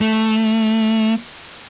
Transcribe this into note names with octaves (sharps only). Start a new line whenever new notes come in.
A3